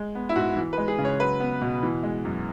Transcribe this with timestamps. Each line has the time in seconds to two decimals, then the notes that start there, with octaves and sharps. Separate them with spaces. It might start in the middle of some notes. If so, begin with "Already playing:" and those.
Already playing: G#3
0.15 B3
0.29 E4
0.36 G#2 F#4
0.56 E3
0.73 B4
0.78 G#3
0.88 G#4
0.98 C#3
1.05 C#5
1.20 F#3 B4
1.40 B3
1.61 B2
1.83 E3
2.03 G#3
2.25 F#2